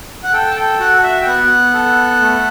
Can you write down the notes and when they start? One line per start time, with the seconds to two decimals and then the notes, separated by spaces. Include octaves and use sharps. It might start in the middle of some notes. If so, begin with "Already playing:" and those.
0.23 F#5
0.33 A4 G5
0.50 A5
0.56 G5
0.79 F#4 F#5
1.03 E5
1.21 G5
1.26 B3 F#5
1.74 A4
2.20 A3